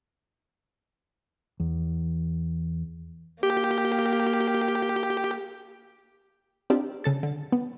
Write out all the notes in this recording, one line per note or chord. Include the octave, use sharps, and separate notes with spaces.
E2
A#3 G4
C4 D4 D#4 F4 G4
C#3 A4 A6
D3
B3